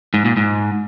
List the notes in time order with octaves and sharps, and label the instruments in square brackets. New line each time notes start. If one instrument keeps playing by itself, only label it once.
[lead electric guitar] G#2
A#2
G#2